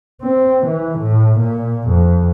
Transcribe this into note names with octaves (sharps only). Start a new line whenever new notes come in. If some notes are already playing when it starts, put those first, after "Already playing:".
C4
E3
A2
A#2
F2